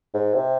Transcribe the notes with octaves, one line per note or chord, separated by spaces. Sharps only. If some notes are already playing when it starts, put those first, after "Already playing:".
G#2
C3